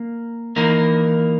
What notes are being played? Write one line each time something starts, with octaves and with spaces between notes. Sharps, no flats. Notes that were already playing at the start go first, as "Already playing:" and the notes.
Already playing: A#3
E3 A#3 D#4 A#4